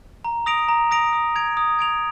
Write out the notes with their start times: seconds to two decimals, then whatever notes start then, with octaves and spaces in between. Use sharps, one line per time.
0.25 A#5
0.46 D#6 A#6 D7 F7
0.68 A#5
0.91 D#6 A#6 D7 F7
1.13 D#6
1.36 G#6 D7 F7
1.57 D#6
1.79 G#6 D7 F7